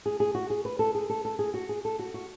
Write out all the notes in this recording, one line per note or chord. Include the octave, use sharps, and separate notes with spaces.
G#4
G#4
F#4
G#4
B4
A4
G#4
A4
A4
G#4
F#4
G#4
A4
F#4
F#4